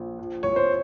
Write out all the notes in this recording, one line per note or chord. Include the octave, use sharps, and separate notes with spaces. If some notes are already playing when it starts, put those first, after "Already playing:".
Already playing: A#1
F3
C2 C#5
C5